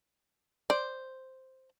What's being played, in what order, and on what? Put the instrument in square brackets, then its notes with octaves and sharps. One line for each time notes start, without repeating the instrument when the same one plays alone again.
[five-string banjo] C5 [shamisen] D5